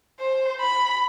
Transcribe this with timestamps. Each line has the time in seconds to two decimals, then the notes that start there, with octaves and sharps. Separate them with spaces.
0.20 C5
0.61 B5